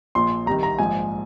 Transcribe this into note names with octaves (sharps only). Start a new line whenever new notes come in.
A#1 A#2 F3 C6
C2 C3 D#3 A#5
A#5
A#1 G#2 F3 G#5